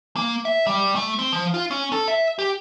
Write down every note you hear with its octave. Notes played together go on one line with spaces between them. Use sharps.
A#3
E5
G3
A3
C4
F3
F4
C#4
A4
E5
G4